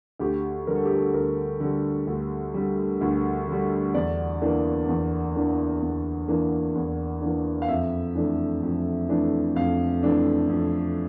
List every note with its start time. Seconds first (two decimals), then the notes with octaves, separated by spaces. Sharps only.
0.20 D2 G4
0.67 D3 G3 A#4
0.76 A4
0.85 G4
0.94 A4
1.14 D2 A#4
1.60 D3 G3
2.07 D2
2.54 D3 G3
3.01 D2
3.47 D3 G3
3.94 E2 D5
4.42 E3 A#3 D4
4.89 E2
5.35 E3 A#3 D4
5.82 E2
6.28 E3 A#3 D4
6.75 E2
7.22 E3 A#3 D4
7.62 F5
7.68 F2 E5
8.15 E3 A3 D4
8.63 F2
9.09 E3 A3 D4
9.56 F2 F5
10.03 E3 A3 D4
10.49 F2